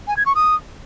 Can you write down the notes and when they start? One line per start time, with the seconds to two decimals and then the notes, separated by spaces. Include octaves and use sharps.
0.07 G#5
0.17 G#6
0.26 C#6
0.35 D#6